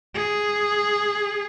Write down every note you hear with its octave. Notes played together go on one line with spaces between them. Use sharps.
G#4